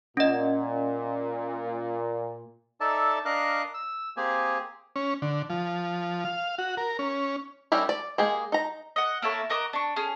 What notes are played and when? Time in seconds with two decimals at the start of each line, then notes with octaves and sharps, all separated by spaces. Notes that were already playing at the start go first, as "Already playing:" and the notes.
0.17 A#2 C#4 D#5
2.81 D#4 A4 D5 E5 A5
3.25 D4 A#4 D#5 F5 F#6
3.74 E6
4.17 A#3 C4 G4 G#4 G#5
4.96 C#4
5.22 D3
5.50 F3
6.25 F5
6.58 F#4
6.77 A#4
6.99 C#4
7.72 G3 C#4 E4 G4 A#4
7.89 D5
8.18 G#3 A#3 G4 G#4
8.52 D#4 A#5
8.96 D#5 F#5
9.22 A#3 E4 A4 C#5
9.50 F#4 A#4 D#5 D6
9.73 D4 C#6
9.96 C#4 G#4